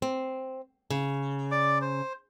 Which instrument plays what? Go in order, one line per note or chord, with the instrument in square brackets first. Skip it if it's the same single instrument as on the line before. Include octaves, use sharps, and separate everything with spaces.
[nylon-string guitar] C4
C#3
[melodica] D5 D6
C5